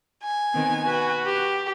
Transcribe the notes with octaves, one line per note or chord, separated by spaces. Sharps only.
G#5
D#3 B3 C4
F#4 B4
G4